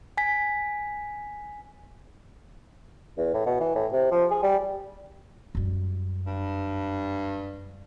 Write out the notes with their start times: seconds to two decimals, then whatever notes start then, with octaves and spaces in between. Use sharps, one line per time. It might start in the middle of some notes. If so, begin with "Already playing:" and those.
0.17 G#5 B6
3.18 E2
3.34 A2
3.46 B2
3.60 E3
3.75 A2
3.93 C3
4.11 F3
4.31 G#4
4.43 G3
5.55 F#2 G3
6.27 G2